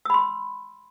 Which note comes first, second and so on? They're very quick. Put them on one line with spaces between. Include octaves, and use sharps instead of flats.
E6 B5 C6